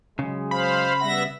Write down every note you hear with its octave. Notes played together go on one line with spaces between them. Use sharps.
C#3 F#3 G#3
C5 F5 B5
G3 B3 E5 F#5 A#6